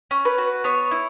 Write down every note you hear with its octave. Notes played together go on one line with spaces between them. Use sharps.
C#4
B4
F#4
B3 C#5
E4